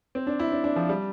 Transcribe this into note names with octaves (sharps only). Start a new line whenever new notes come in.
C4
D4
E4
D4
D4
F3
G3